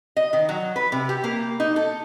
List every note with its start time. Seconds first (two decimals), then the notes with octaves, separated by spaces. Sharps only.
0.17 D#5
0.33 D#3
0.49 F#3
0.76 B4
0.92 C3
1.09 G4
1.24 A#3
1.60 D#4
1.76 A4